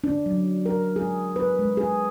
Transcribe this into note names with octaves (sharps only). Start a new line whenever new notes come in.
D4
F#3
A#4
G#4
B4
G#3
G#4